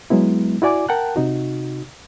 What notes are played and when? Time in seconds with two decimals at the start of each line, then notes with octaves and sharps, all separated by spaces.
0.10 F#3 G#3 B3 E4
0.62 E4 F#4 D5 G#5 D6
0.89 A#4 F#5 G5 A5 F#6
1.16 C3 D#4 F#4